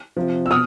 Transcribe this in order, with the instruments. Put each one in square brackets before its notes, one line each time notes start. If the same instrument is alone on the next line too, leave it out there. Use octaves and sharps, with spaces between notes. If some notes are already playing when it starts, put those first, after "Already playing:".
[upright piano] C3 F3
E6
B2 D#6 F6